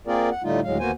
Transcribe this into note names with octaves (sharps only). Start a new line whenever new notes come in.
A#3 C4 F4 G#4 A#4 D5
F#5
A2 D3 G3 A3 D#4 F4
D2 A2 F#3 G#3 F5
D#2 A#3 B3 F#4 C5 G#5